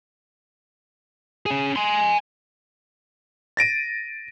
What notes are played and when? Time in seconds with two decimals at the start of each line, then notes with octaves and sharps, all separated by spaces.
1.46 C#4 G#4
1.76 G#5 C6
3.57 A6 A#6 D7 D#7